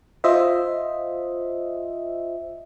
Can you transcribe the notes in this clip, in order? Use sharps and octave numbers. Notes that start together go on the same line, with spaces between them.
F4 C5 D#5 E5